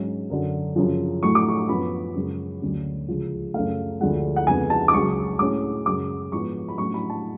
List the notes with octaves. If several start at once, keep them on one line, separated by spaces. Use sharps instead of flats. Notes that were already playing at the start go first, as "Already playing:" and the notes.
Already playing: G#2 F#3 C#4
F#2 D3 F#3
F#2 C#3 F3
A2 F#3 A3 C#6
D6
C#6
F#2 F3 B3 B5
F#2 C#3 G#3
D2 D3 F#3 C#4
C#2 C#3 F3 G#3
F#2 C#3 F#3 A3 F5
D2 D3 F3 G#3 F#5
F#5
F2 C#3 G#3 B3 G#5
A5
D6
C#2 C#3 F#3 C#6
A2 G#3 C#4 D6
F#2 C#3 G#3 D6
G#2 F3 B3 C#6
B5
A2 F#3 C#4 C#6
B5
A5